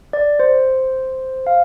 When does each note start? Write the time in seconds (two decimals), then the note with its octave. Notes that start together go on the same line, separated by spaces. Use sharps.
0.13 D5
0.40 C5
1.47 F5